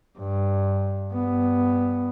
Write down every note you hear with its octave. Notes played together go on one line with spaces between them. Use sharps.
G2
G2 B3